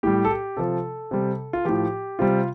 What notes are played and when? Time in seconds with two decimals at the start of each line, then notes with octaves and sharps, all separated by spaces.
0.03 A2 G3 G4
0.25 A4
0.30 G4
0.57 C3 F3 A4
1.11 C3 G3
1.53 F4
1.65 A2 F3 G4
2.19 C3 G3 F4